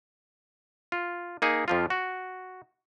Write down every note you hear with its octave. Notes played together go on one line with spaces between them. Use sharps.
F4
A#3 D#4 G#4
F2 F3 F4
F#4